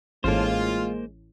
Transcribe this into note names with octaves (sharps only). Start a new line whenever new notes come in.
A1 A2 G#3 A#3 F4 C5